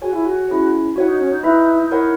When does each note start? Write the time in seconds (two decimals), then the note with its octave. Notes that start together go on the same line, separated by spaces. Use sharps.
0.02 F#4 G#4 C#5 G#5
0.13 E4
0.25 F#4
0.49 C#4 E4 G#4 C#5
0.96 E4 F#4 C#5 F#5
1.08 D#4
1.19 C#4
1.31 D#4
1.43 D#4 E4 B4 E5
1.91 E4 A#4 C#5 F#5